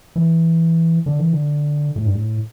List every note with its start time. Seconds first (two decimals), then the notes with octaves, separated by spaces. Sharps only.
0.16 E3
1.06 D3
1.19 E3
1.32 D3
1.96 A2
2.05 G2
2.14 A2